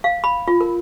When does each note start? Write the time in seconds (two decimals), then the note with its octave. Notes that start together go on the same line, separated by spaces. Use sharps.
0.04 F5
0.24 B5
0.48 F4
0.61 A#4